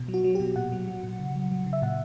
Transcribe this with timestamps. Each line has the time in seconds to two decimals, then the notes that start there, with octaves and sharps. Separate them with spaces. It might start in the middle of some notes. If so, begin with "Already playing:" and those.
Already playing: B2
0.08 F#3
0.14 F#4
0.24 F#3
0.35 B2 G4
0.56 A#2 F#5
0.72 F#3
0.88 F#3
1.04 A#2
1.20 C#3
1.36 F#3
1.51 F#3
1.66 C#3
1.73 E5
1.82 A#2 F#5